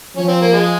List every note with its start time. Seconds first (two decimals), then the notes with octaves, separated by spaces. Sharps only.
0.16 F3 C#4
0.28 C4
0.41 A#3
0.53 G#3